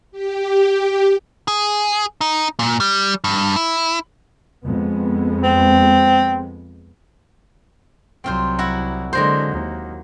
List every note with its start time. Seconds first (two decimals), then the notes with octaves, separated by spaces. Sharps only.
0.11 G4
1.48 G#4
2.21 D#4
2.59 A#2
2.80 G3
3.24 G2
3.56 E4
4.64 F2 G#3 B3
5.43 C4
8.24 C2 F#3 C4 F4 C5
8.59 E4 F#4
9.13 D3 F#3 G#3 A#3 C5
9.52 D#2